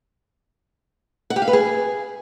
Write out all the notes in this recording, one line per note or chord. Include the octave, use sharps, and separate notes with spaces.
F#5
G4
F5
B4
G#4